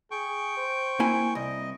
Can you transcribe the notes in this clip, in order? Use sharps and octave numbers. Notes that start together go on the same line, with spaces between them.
G#4 G5 C#6
C5
A#3 E4 G#5
C2 D#5